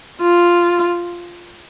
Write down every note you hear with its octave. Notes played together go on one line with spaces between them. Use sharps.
F4